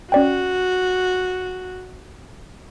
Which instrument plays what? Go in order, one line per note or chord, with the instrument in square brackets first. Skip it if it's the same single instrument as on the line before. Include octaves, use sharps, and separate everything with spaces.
[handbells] C#4 D5 G5 [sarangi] F#4